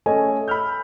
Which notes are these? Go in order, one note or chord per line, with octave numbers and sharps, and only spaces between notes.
A3 C#4 A4 D#5 G#5
B5 E6 F6 G6